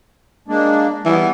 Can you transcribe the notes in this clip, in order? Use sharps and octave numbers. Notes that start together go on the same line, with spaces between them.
G#3 A#3 D4
E3 G3 B3